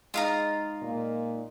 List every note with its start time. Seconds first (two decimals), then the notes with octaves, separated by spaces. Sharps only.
0.14 G#3 D#4 F4 D#5 F5 A#5
0.82 A#2